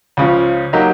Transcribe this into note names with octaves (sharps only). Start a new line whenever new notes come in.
C#2 C#3 F3
F#3 A#3 D#4 G4